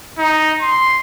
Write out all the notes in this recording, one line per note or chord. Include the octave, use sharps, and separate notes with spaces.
D#4
C6